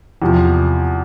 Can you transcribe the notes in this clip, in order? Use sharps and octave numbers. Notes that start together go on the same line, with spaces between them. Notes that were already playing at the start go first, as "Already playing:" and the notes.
E2 C3 F3